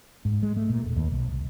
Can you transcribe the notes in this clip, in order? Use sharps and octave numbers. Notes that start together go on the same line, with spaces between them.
G#2
G#3
A3
A#2
E1
D#2
B1
C2